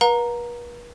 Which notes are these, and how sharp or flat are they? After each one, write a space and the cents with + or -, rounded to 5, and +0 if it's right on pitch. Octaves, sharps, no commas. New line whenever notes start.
B4 -45 F5 +45 A#5 +0